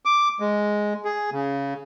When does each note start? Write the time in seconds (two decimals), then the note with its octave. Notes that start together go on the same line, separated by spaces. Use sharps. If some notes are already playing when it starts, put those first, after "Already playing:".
0.05 D6
0.40 G#3
1.05 G#4
1.32 C#3